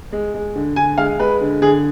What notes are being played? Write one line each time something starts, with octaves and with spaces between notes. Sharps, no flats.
G#3
G#3
D3
D3 G#5
G#3 F5
G#3 B4
D3
D3 G#4